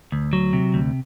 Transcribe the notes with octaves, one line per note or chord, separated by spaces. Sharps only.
D2
F#3
C3
D2